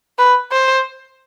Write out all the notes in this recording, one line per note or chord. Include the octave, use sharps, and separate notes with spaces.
B4
C5